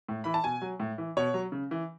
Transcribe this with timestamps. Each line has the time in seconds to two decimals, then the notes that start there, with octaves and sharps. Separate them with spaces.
0.09 A2
0.24 E3 B5
0.34 A5
0.44 B2 G#5
0.62 F#3
0.80 A2
0.98 E3
1.17 B2 C#5
1.34 F#3
1.52 C#3
1.71 E3